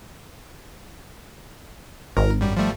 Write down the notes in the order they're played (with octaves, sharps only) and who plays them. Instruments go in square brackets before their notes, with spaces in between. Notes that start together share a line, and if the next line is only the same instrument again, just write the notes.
[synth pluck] G#1 [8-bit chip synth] A#4
[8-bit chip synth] F#2 G3
F3 G3 A3